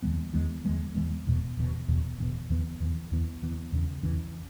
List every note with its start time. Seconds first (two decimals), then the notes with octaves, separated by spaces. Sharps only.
0.03 E2 E3 G#3 B3
0.33 E2 E3 G#3 B3
0.65 E2 E3 G#3 B3
0.95 E2 E3 G#3 B3
1.27 E1 E2 B2
1.57 E1 E2 B2
1.88 E1 E2 B2
2.18 E1 E2 B2
2.50 E2 E3 B3
2.80 E2 E3 B3
3.11 E2 E3 B3
3.42 E2 E3 B3
3.72 E2 C#3 E3 C#4
4.03 E2 C#3 E3 C#4